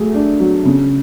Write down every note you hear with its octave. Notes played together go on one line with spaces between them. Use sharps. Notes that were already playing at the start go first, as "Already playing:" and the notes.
Already playing: F#3 A3 G#4
D4
F#3
C#3